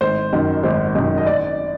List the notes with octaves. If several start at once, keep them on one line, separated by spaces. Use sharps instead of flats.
G#1 C5
F#2 D#3
G#1 C5
F#2 D#3
D#5
D5